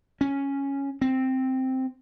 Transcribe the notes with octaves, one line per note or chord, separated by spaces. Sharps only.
C#4
C4